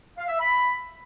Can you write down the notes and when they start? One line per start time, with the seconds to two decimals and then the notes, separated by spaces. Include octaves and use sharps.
0.18 F5
0.29 E5
0.39 B5